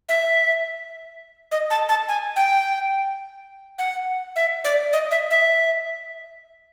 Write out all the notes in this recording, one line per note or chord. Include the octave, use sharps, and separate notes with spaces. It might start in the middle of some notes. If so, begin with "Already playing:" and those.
E5
D#5
A5
A5
G#5
G5
F#5
E5
D5
D#5
E5
E5